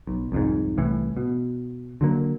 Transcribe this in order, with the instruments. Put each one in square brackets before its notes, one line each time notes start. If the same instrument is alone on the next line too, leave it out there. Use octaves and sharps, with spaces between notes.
[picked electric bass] B1
C2 F2 G#2
C2 A2 E3
B2
D3 F#3 A#3